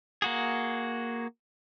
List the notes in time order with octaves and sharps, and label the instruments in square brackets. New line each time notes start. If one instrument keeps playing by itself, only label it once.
[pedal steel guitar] A#3 F#4 G#4